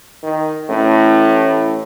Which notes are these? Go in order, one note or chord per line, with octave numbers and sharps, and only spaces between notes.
D#3
A1 A2